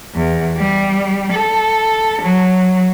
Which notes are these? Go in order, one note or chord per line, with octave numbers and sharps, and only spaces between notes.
E2
G3
A4
F#3